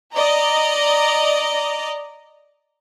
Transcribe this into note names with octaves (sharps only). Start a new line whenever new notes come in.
D5 D#5 A#5